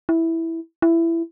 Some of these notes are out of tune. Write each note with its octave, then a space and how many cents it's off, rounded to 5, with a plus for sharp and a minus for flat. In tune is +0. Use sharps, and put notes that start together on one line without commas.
E4 -5
E4 +15